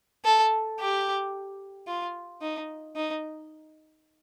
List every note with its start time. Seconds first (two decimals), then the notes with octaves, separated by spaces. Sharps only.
0.25 A4
0.79 G4
1.88 F4
2.42 D#4
2.96 D#4